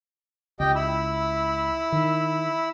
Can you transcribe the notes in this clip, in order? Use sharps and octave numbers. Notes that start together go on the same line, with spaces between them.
C#2 G4 D#5 G5
E4 B5 E6
D#3